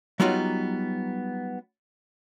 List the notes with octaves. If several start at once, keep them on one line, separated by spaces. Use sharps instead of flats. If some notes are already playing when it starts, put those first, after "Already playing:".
F#3 G3 B3 D#4 F4 F#4